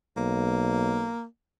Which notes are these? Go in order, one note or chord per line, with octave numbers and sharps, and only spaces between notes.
B1 A#3